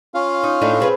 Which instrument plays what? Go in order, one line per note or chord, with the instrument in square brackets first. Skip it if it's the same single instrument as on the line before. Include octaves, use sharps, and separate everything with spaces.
[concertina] C#4 F4 F5
[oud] D#4
A2 D4 D#4
C4 G#4 B4